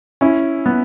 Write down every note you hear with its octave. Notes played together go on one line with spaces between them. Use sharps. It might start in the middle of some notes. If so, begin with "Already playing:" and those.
C#4 E4
B3